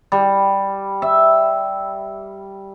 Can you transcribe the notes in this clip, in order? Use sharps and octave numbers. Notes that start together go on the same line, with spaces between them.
G3
E5